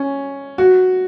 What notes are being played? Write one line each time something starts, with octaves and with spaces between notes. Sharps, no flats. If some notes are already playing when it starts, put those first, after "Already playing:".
Already playing: C#4
F#4